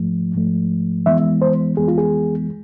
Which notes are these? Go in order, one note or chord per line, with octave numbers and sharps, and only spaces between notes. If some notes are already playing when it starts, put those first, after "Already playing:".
Already playing: G#2 F3 A3
G#2 F3 A3
F2 E3 G#3 B3 E5
C5
F2 E3 G#3 B3 G#4
F4
G#4